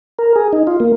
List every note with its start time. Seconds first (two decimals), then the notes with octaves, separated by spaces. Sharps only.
0.19 A#4
0.36 G#4
0.53 D#4
0.67 F4
0.80 A#3